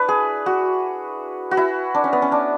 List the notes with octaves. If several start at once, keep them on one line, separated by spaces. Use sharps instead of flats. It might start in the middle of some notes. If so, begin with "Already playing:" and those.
Already playing: D4 E4 B4
G#4
F#4
F#4
E4
D4
C#4
B3
C#4
D4